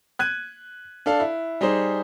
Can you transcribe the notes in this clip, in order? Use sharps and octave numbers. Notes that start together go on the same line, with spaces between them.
F#6 G#6 D#7
D4 A4 F5
E4
G3 D#4 G#4 C5